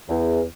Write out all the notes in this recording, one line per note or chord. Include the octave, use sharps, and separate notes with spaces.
E2